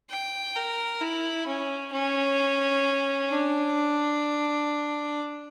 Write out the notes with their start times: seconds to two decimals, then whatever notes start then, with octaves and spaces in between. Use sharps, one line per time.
0.10 G5
0.56 A#4
1.01 E4
1.47 C#4
1.92 C#4
3.30 D4